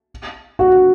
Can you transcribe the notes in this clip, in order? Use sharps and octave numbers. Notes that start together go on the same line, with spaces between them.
F#4